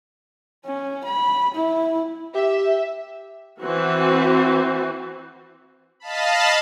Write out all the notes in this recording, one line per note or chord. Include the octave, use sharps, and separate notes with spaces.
C#4
B5
E4
G4 E5
E3 C4 F#4
D#5 F5 A5 B5